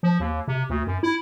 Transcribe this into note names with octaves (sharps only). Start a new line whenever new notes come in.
F3
D#2
C3
D2
F#2
E4